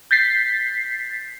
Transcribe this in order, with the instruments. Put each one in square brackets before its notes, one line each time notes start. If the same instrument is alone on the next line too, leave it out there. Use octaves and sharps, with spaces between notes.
[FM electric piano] G6 A6 B6 C7